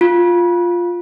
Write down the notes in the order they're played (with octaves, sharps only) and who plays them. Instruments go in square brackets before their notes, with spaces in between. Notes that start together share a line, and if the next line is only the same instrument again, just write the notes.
[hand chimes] F4